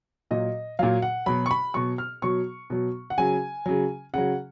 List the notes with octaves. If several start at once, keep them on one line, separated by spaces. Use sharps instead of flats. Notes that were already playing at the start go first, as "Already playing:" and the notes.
A#2 F#3 D#5
A#2 F#3 F5
F#5
B2 F#3 B5
C#6
B5
B2 F#3 C#6
F6
B2 F#3 C#6
B2 F#3
F#5
C#3 F#3 G#5
C#3 F#3
C#3 F#3 F#5